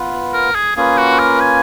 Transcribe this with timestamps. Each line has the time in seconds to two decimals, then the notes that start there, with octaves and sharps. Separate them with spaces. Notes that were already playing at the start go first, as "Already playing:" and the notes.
Already playing: B3 F4 B4
0.33 A#4
0.55 G#4
0.76 A#3 C#4 F4 G#4 B4
0.98 F#4
1.19 A#4
1.40 G#5